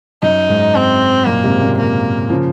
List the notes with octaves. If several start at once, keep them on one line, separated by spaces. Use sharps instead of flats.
F#2 D#4
G#2
C4
F#2 A#2 A#3
G#2 C3
A#2 C#3
A#3
C#3 F3